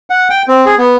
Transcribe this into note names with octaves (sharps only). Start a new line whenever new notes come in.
F#5
G5
C4
G#4
B3